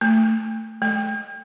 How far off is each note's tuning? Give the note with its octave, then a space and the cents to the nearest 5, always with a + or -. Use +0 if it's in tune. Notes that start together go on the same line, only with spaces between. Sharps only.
A3 +10
A3 -40